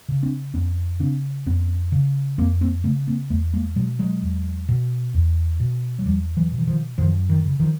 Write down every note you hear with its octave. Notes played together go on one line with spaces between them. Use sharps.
C#3
C4 D4
F2 B3 C#4
C#3 C4 D4
F2 B3 C#4
C#3
F2 A#3 C4
A#3 C4
C#3 A3 B3
A#3 C4
E2 A3 B3
G#3 A#3
B2 F#3 G#3
F#3 G#3
E2
B2
E2
B2
F#3
E2 F3 G3
E3 F#3
B2
E3
D#3 F3
F#2 D#3 F3
D#3
C#3
D#3 F3